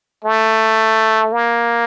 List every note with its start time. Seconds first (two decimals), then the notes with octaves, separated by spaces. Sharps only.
0.24 A3
1.33 A#3